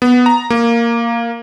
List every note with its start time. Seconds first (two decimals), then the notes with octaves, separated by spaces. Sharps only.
0.02 B3
0.26 A#5
0.50 A#3